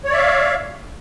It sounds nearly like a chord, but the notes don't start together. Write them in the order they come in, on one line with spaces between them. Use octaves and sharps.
C#5 D5 E5 F5